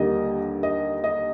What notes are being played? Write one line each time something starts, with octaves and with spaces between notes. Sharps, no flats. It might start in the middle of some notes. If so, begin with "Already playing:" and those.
Already playing: D#2 D3 G3 A#3 D#5
D#5
D#5